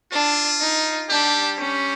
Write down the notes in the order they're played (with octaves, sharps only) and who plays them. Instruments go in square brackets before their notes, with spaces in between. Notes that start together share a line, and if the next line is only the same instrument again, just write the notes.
[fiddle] D4 [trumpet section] F4
[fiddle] D#4
[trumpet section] G3 G4 [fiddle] D4
[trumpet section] G3 G4 [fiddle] C#4